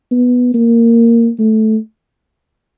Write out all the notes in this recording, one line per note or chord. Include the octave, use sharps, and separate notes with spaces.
B3
A#3
A3